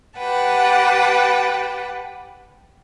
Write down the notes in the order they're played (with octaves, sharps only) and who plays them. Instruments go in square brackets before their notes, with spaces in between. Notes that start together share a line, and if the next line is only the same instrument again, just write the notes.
[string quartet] G4 B4 F#5 G5 A5